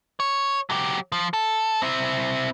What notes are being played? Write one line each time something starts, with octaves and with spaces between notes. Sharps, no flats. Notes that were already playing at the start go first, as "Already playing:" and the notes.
C#5
F#3 G4
F3
A4
C4 E4